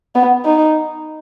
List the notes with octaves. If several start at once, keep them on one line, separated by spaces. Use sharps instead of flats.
B3
D#4